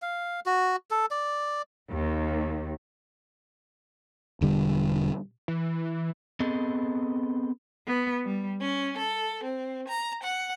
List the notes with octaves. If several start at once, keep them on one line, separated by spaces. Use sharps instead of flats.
F5
F#4
A4
D5
D#2
E1 D3 G3
E3
B3 C4 G#4 A4 D#5
B3
G3
C#4
A4
C4
A#5
F#5